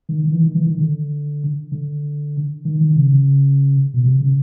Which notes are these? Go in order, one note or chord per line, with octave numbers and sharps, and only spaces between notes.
D#3
D#3
E3
D#3
E3
D#3
D3
D3
D#3
D#3
C#3
C#3
B2
C3
C#3